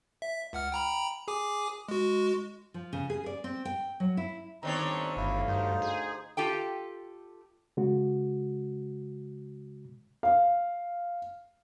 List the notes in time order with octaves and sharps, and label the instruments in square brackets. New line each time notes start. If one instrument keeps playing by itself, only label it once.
[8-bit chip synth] E5
C#2 F#5 F6
G5 A#5 B5
G#4 G#5 D6
G#3 F#4
[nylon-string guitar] F3
C#3
G#4
D5
C4
G5
F#3
E4
[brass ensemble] G1 E5 A#5 [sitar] D#3 D4 C#5 [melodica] C4
[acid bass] G1 [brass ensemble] D2 F5 [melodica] E4
[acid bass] G2 [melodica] D#4 C5
[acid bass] G#4
[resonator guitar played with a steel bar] F4 G4 A4 G5
[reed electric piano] C#3 G#3 F#4
[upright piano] F5